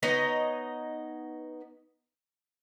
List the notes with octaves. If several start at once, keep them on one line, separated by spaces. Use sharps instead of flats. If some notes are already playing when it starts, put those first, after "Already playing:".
B3 D#4 C#5 D#5